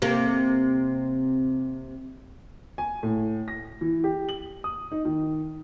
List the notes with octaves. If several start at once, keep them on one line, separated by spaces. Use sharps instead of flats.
C3 A#3
G#5
A2
A#6
E3
G4
F#7
D#6
D#4
D#3